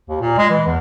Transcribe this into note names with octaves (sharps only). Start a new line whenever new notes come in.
D#2
A#2
G#3
E3
E2